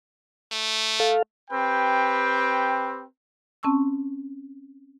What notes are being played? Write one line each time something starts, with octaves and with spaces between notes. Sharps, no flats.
A3
A4 F5
C4 G4 B4 G5
C4 C#4 A5 C#6 E6